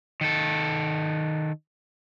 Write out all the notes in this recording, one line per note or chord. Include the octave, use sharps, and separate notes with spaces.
D#3 A4